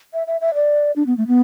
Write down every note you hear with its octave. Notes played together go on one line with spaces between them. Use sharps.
E5
E5
E5
D5
D4
B3
A3
B3